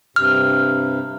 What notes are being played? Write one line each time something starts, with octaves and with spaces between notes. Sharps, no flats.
G2 C3 F6